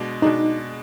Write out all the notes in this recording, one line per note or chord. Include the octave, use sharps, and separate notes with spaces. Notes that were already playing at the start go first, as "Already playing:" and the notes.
Already playing: B2 G#3 D4
B2 G#3 D4 D#4